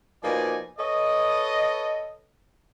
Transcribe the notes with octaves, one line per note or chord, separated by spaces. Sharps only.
B2 F3 A#3 D#4 D5 G#5
A4 B4 C#5 D#5